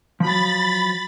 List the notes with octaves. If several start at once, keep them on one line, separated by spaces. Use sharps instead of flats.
F3 F#3 B5 A6